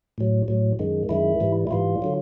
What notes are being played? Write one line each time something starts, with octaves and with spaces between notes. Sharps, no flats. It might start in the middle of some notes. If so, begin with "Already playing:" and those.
A2 F#3
A2 F#3
F#2 D#3 G#3
F#2 D#3 G#3 E4
G#2 E3 G3
E4
G#2 E3 G3 F4
D3 F#3